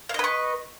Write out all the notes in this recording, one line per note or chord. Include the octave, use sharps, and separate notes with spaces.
B4 D#5 F5 C#6